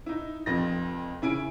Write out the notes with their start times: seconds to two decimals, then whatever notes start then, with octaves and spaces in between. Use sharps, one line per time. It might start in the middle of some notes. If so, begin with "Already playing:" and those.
0.06 D#4 E4
0.46 F1 F2 A#6
1.22 C#3 E4 G#5 D7